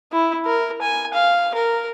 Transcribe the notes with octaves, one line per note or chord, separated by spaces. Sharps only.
E4
A#4
G#5
F5
A#4